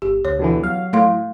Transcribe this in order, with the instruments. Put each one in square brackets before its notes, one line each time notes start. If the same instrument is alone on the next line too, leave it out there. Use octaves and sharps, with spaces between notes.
[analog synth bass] G#1 [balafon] G4
[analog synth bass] D2 [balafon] C#5
[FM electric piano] B2 D3 E3
[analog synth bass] F#3 [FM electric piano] F5
[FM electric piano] A2 [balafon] A3 F5 C6